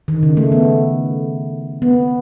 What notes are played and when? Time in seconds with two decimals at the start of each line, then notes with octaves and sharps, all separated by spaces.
0.08 D#3
0.23 C#3
0.37 A3
0.52 B3
1.82 B3